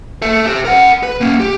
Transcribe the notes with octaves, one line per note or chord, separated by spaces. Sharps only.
A4 E5
G4 C5
A#4 F#5
B4
A#3 C#4
G4